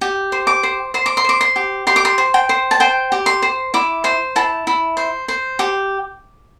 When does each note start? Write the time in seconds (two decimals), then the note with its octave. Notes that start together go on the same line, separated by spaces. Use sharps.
0.01 G4
0.32 C5
0.47 D6
0.63 C5
0.94 C5 C6
1.06 D6
1.17 C6
1.24 C5 D6
1.41 C6
1.56 G4
1.87 G4 C6
1.96 D6
2.05 C6
2.18 C5
2.34 G5
2.49 C5
2.71 A5
2.80 C5 G5
3.12 G4
3.26 C6
3.42 C5
3.74 E4 D6
4.04 C5 C6
4.36 E4 A5
4.67 E4
4.97 C5
5.28 C5
5.59 G4